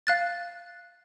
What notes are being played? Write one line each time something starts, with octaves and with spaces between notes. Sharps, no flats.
F5 F#6 A6